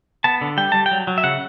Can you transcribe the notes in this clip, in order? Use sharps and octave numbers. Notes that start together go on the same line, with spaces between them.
B3 A5
D3
G3 G5
G3 A5
G5
F#3
F#3
E5
C#3 F#5